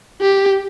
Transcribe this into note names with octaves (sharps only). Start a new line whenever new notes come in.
G4